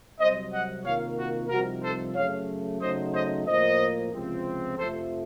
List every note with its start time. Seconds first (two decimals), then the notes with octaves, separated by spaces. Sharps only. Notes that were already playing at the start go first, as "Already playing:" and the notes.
0.19 C2 C3 F#3 C5 D#5
0.52 D#5 F#5
0.84 C3 D#3 A#3 F4 C#5 F5
1.18 F#4
1.50 C2 C3 F3 C4 D#4 F#4 A#4
1.82 A4 C5
2.16 F#2 C#3 A3 C#5 F5
2.80 C#3 F#3 A3 D#4 C5 D#5
3.13 C5 D#5
3.46 A2 F3 A#3 C5 D#5
4.11 C#2 C3 F3 C4
4.77 F2 C3 F3 A3 A4 C5